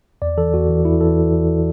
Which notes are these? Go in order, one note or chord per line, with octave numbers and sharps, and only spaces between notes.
E2 D5
E3 A4
E2 F#4
E3
E2 E4
E3 A4